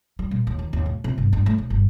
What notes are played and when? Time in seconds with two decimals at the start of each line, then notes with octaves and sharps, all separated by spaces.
0.19 G3
0.31 A#2
0.47 D#2
0.59 D#3
0.73 D#2
0.86 A2
1.04 C3
1.18 G1
1.33 G2
1.46 A3
1.58 A#1
1.70 G1